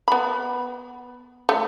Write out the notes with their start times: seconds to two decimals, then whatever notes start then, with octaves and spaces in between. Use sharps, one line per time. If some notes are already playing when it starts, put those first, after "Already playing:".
0.08 B3 B5
1.49 A3